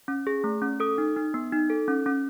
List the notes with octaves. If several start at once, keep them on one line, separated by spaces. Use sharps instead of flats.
C#4
G#4
A3
C#4
A4 D#6
D#4
D#4
B3
D#4
A4
C#4
C#4